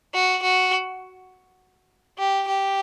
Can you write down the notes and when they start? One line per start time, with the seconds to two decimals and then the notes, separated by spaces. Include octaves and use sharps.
0.14 F#4
0.43 F#4
2.18 G4
2.48 G4